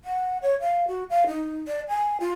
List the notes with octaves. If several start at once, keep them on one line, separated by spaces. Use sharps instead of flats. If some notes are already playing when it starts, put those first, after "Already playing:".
F#5
C#5
F5
F#4
F5
D#4
D5
G#5
F4